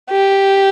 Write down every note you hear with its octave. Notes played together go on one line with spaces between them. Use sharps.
G4